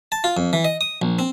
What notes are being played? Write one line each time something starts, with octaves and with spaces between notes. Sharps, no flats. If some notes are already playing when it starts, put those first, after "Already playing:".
A5
F4
F2
E3
D#5
D#6
A#1
C4